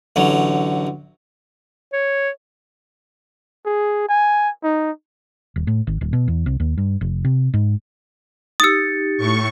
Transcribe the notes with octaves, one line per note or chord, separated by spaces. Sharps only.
A1 D3 F#3
C#5
G#4
G#5
D#4
D#1
A2
G#1
D1
B2
E2
C2
D#2
G2
F1
C3
G#2
D#4 G4 D#6 E6 A6 C#7
A2 C#6